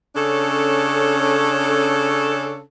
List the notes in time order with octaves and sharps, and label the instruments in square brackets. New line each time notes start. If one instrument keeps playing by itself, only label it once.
[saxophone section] C#3 C#4 D4 A4